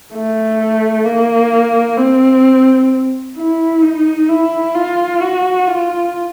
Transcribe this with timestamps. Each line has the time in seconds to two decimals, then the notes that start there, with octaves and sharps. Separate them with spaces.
0.13 A3
1.05 A#3
1.97 C4
3.36 E4
3.82 D#4
4.29 E4
4.74 F4
5.21 F#4
5.67 F4